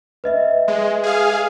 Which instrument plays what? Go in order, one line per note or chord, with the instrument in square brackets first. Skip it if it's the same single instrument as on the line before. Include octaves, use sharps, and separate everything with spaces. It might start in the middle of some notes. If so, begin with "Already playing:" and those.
[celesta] B4 D#5 E5
[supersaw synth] G#3
G#4 F5